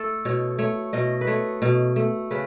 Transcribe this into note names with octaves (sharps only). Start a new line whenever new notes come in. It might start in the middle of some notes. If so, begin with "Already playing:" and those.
Already playing: A3 A4
B2 C#5
A3 C#5
B2 D#5
B4
A3 C#5
B2
A3
C#3 B4